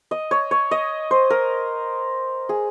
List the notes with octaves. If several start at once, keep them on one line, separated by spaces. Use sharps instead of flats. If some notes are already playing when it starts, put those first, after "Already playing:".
D#5
C#5
C#5
D#5
C5
A#4
G#4